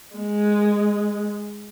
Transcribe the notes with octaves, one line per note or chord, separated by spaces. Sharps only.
G#3